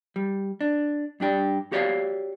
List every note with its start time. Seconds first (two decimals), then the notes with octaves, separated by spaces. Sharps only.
0.16 G3
0.61 D4
1.20 G2 D4 G4 D5
1.72 F#4 G4 C#5 D5 E5 F5